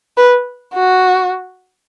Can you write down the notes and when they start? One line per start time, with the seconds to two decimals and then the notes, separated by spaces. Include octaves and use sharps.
0.17 B4
0.74 F#4